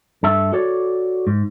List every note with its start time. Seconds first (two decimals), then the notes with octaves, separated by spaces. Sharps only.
0.23 G2 A4 E5
0.53 F#4 A4 C#5 D5
1.27 G#2